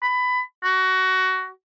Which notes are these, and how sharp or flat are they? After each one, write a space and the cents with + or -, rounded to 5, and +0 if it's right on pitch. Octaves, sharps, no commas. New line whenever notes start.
B5 +20
F#4 +20